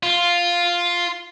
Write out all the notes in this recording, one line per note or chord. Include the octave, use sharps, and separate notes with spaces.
F4